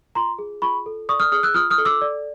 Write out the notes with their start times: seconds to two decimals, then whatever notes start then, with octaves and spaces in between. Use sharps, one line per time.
0.15 F4 A#5 C6
0.39 G#4
0.62 F4 B5 C#6
0.86 A4
1.09 D5 C#6 D#6
1.20 D#6 F6
1.32 G#4 D#6 F6
1.43 E6 F#6
1.54 F4 D#6 F6
1.70 D#6 F6
1.78 A4
1.85 D6 E6
2.01 D5